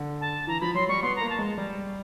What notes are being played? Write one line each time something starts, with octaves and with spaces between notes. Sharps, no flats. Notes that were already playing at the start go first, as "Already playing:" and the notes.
Already playing: D3
A5
E3 A#5
F3 B5
F#3 C6
G3 C#6
B3 C6
A#3 A#5
A5
G#3
G3